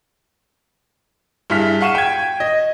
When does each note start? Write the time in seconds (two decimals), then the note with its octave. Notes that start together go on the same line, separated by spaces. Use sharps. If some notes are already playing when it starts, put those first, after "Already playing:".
1.50 G2 E4 G#4 F6 B6
1.81 F5 F#5 C#6 D#7 E7
1.95 G5 G#6
2.40 D#5